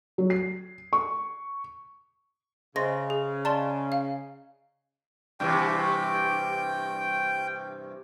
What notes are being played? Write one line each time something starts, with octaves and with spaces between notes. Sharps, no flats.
F#3
C7
C#6
C#3 C5 D#5 E5 C6 A#6
G#4
D5 D#5 A5 A#5 C6
F5
G2 C3 E3 G5